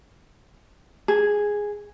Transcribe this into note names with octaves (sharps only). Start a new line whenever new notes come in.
G#4